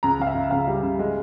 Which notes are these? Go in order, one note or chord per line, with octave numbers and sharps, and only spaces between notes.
C#2 A#5
C#3 F5
E5
C#3
C#2 F5
G3
C#3
G#3